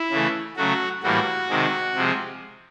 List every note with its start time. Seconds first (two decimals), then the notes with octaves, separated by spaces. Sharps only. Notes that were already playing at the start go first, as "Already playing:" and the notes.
Already playing: E4
0.11 C#3 E3 A3
0.56 C#3 F#3 A3 F#4
1.03 A2 E3 G3 A#3 F#4
1.49 C3 D#3 G#3
1.95 C3 F3 G#3